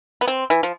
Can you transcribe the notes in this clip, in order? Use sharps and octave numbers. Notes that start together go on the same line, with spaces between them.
B3
C4
E3
F3